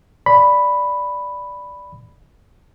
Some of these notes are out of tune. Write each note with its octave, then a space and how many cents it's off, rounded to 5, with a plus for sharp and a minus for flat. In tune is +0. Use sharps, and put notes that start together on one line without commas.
D5 +0 B5 +0